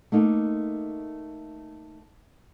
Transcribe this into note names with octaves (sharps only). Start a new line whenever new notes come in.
A3 A#3 D#4